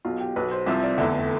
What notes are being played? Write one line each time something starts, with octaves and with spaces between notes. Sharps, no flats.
B1 B2 F4
G4
B1 B2 B4
C5
C2 C3 F3 E5
D5
F1 E2 D3 E5